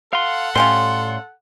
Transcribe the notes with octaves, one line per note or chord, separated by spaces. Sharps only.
A4 F5 F#5 C6
A2 G3 C#4 F4 C6